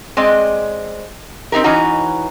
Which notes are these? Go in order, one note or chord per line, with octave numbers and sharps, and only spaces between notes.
G#3 C4 D5 D#5
C4 D#4 G4 A#4
E3 C#4 D#4 F#4